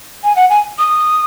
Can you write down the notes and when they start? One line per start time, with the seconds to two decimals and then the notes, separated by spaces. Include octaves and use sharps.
0.24 G#5
0.36 F#5
0.50 G#5
0.79 D#6